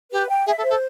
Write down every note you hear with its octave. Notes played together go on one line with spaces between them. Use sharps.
G4 B4
G5
G#4 E5
A4
C5
A4